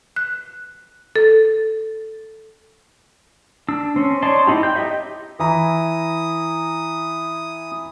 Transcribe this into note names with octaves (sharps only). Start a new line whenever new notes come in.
F#6
A4
D4 E6
C4 C#4
D#4 C#5 D5 A5 C6
C4 D#4 E4 G4
G5 G6
D#4 G4 D#5 E5
E3 E4 A#5 D#6